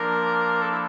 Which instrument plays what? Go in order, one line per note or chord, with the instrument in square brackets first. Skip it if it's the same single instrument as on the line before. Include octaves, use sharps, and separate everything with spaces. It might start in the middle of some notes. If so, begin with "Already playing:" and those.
Already playing: [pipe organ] F3 A#3 D4 [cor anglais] A#4
[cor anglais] A4
E4